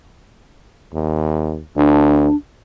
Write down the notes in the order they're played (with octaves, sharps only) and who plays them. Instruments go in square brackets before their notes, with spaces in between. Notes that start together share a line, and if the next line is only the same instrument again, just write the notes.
[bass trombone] D#2
[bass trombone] D2 [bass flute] D4